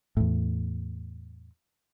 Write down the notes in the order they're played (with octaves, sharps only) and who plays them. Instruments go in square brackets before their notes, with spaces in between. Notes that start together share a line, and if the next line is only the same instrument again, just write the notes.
[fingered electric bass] E2 A2